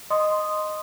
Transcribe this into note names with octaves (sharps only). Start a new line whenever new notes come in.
D#5 C6 D#6